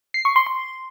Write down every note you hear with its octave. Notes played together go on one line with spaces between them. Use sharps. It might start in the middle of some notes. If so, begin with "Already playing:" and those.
C7
C#6
C6
C6